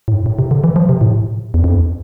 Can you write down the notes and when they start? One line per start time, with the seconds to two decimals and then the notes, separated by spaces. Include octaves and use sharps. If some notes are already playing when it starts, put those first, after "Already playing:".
0.08 A2
0.13 G2
0.26 A2
0.39 C3
0.51 D3
0.64 E3
0.76 F3
0.89 C3
1.01 A2
1.54 E2
1.64 F2